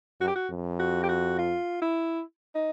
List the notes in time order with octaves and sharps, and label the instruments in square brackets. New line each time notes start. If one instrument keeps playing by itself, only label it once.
[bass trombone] F#2 [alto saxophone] F#4
[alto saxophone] G4
F#4
[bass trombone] F2
[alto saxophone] F#4
G4
F#4
F4
E4
D#4